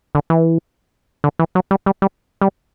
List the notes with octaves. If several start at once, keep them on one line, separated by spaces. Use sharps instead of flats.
D3
E3
D3
E3
F#3
G3
G3
G3
G3